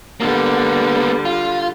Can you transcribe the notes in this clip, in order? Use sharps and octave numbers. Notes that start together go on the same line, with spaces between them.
D3 G3 A#3 B3
F4